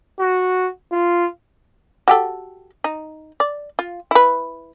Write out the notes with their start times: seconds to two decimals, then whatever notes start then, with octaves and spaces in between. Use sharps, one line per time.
0.19 F#4
0.92 F4
2.08 F#4 G4 A4
2.84 D#4
3.40 D5
3.79 F4
4.11 E4 B4